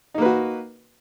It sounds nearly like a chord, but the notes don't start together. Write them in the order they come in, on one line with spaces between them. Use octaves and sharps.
D#4 A#3 B4 F#4